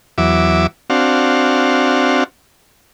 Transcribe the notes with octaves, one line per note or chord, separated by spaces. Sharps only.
E2 F#3 E5 D6
C4 D4 F#4 F5